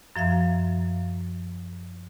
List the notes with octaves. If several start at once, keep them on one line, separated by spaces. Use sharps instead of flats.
F#2 F3 E5 F5